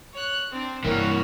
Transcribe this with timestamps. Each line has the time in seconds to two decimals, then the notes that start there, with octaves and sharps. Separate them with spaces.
0.13 C#5 F#6
0.50 C4 D4
0.84 G2 E3 G3 A#3 F#4 A#4 C#5